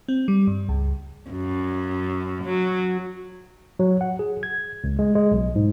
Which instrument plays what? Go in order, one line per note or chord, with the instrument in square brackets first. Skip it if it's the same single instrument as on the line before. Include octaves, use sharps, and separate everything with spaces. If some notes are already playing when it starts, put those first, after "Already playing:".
[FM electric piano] C4
G3
G2
C#2
[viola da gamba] F#2
F#3
[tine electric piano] F#3
F#5
G#4
G#6
C#2
G#3
G#3
B1
G#2